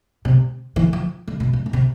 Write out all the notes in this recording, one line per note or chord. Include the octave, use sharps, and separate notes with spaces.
C3
E3
F3
D3
B2
A#2
B2
C3